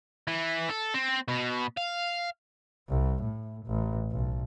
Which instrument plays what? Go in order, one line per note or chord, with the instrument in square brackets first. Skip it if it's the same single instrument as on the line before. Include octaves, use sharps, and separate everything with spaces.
[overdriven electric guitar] E3
A4
C4
B2
F5
[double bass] C2
A2
A1
B1